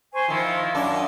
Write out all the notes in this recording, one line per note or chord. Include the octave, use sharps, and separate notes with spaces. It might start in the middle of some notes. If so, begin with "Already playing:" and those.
C5 G#5 C#6
D#3 F3 E4 C6
F#2 D4
D#6